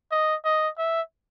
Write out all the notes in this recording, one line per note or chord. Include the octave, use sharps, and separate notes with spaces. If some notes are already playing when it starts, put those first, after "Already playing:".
D#5
D#5
E5